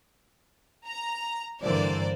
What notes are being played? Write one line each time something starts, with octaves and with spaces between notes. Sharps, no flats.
A#5
G2 D3 E3 A#3 C5 D5